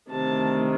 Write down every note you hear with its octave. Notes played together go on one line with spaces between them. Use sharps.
D2 C3 D#3 A5